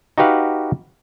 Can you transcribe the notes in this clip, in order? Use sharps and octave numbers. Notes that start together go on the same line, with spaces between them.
D#4 F#4 G4 B4 F5 F#5